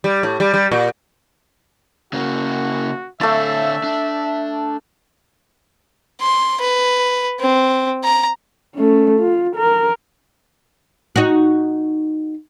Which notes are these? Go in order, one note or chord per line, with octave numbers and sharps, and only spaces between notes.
G3
A2
G3
G3
A#2
C#3 A#3 F#4
D3 A3 D5 E5 F5
D4
C6
B4
C4
A#5
A3 C#4
F4
A#4
D#4 F#4